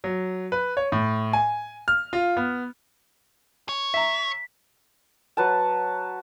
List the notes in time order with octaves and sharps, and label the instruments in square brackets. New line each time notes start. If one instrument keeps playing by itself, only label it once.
[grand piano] F#3
B4
C#5
A2
G#5
F6
F4
B3
[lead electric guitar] C#5
[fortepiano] E5 A#5 [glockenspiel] B6
[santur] F#3 B4 A5